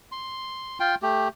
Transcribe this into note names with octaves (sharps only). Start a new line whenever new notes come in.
C6
F4 G5 C6
A3 G4